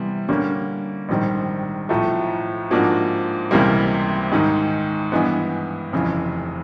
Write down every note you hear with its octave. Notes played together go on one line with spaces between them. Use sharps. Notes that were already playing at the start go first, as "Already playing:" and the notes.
Already playing: C3 E3 G3 B3
D3 G3 A#3 C#4
A#1 G#2 D#3 G3 C4
B1 A2 F3 A3
G#2 F3 A#3 D4 F#4
C#2 C3 E3 G3 A#3
G#2 D#3 G#3
G2 E3 G#3 B3
F1 F2 C#3 E3